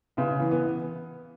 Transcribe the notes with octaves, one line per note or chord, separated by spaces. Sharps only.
C#3 B3
E3
B3